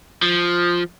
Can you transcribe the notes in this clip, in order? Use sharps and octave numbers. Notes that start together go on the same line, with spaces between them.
F3